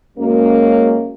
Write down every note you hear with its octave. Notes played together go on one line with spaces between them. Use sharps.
F#2 F#3 G#3 A#3 C#4